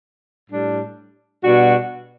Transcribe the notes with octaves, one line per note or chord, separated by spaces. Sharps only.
A2 G3 D4
B2 G3 D4 F#4